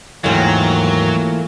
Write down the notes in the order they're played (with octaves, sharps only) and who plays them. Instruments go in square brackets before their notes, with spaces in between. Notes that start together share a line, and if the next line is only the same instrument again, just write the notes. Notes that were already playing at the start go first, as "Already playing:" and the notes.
[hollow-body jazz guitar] D#2 G#2 D#3 [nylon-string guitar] E3 [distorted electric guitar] F#3 [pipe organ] A3 A#3 F4